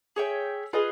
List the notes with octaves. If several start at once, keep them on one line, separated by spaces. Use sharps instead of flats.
G#4 C#5 E5 G5
F4 G#4 B4 D#5